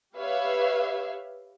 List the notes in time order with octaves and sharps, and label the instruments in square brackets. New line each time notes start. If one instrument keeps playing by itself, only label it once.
[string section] G4 B4 C#5 E5 F5